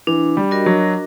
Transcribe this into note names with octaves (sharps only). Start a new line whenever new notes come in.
E3 D4
G3
F#4 A#4 D#5
F#3